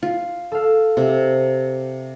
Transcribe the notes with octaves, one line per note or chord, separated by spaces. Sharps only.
F4
A4 F5
C3